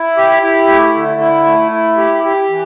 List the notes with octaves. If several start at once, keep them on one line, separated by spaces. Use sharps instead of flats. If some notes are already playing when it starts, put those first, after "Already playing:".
Already playing: E4
G4
E4
A3
D3
E4
A3
E4
G4
G4
E3